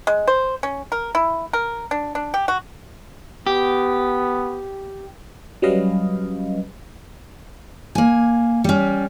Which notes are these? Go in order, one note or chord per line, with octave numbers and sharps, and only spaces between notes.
G#3
C5
C#4
A#4
E4
A#4
D4
D4
G4
F#4
B3 G4
F#3 G3 C#4 B4 D#5 F5
A#3 G#5
G3 C#4